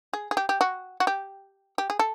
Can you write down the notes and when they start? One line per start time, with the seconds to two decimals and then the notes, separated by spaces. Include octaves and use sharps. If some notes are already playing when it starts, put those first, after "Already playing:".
0.13 G#4
0.31 G#4
0.37 G4
0.49 G4
0.61 F#4
1.00 F#4
1.07 G4
1.78 G4
1.90 G#4
1.99 A4